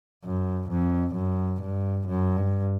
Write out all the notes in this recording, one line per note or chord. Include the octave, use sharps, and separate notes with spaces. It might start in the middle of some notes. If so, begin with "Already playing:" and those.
F#2
F2
F#2
G2
F#2
G2